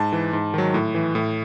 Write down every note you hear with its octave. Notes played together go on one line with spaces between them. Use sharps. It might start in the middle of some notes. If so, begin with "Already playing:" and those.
Already playing: G#2 A5
E3
G#2
D#3 F#3
A2
E3
A2